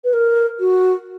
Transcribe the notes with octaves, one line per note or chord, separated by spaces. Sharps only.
B4
A#4
F#4